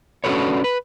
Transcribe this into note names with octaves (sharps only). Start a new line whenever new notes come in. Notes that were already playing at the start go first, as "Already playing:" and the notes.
C#4 D4 F#4 A4 B4 C#5
B4